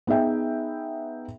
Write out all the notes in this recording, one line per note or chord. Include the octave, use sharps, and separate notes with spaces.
B3 D#4 G#4 E5 G5